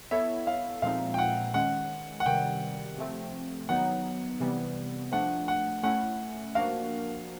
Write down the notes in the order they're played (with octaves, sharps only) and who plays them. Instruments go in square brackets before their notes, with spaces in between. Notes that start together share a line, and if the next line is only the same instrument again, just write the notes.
[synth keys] B3 E4 A4 C#5 [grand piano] E5
[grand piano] F5
[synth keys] A#2 F3 G#3 C4 D#4 [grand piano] F5
[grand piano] G5
F#5
[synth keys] D#3 G#3 C#4 [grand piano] F#5
[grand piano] F#5
[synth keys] C3 D#3 G3 [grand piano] G5
[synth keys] C3 F3 A3 C4
[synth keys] D#3 F#3 B3 D#4 [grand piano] F#5
[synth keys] C3 E3 G3 B3
[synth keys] F3 A3 D4 [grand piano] F#5
[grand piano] F#5
[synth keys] A3 C#4 E4 [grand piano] F#5
[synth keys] F3 A#3 D4 F#4 A#4 [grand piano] F5